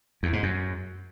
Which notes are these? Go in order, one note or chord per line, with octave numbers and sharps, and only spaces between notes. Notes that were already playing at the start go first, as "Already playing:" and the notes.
E2
G#2
F#2